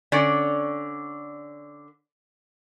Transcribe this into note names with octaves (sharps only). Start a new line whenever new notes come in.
D3 C#4 D5